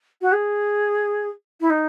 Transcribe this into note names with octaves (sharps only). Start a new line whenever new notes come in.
F#4
G#4
E4
D#4